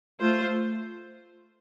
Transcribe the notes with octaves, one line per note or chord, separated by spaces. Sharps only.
A3 F4 C5